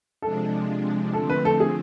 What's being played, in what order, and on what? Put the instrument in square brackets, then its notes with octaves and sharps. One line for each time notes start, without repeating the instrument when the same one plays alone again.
[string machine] C3 F3 G#3 D4 [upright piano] A4
[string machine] D3 F3 A3 C4 [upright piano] A4
[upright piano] B4
A4
G#4